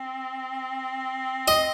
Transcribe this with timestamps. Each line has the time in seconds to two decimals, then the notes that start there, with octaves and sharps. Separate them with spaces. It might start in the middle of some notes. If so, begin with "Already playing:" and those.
Already playing: C4
1.48 D#5